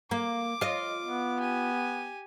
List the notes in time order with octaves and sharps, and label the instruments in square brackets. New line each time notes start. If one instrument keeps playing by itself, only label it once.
[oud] A#3 [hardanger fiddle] D6
[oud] F4 D#5
[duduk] B3
[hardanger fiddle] G4 G#5